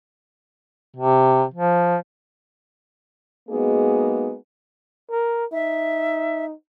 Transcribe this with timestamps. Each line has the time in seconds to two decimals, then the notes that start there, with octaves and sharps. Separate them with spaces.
0.96 C3
1.54 F3
3.49 G#3 A#3 B3 D#4 F#4 G#4
5.11 A#4
5.53 D#4 E5